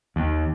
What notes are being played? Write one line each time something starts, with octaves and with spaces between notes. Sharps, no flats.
D#2